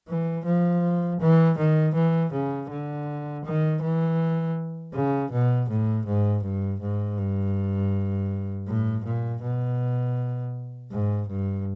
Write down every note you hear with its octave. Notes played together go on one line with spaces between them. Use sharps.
E3
F3
E3
D#3
E3
C#3
D3
D#3
E3
C#3
B2
A2
G#2
G2
G#2
G2
A2
A#2
B2
G#2
G2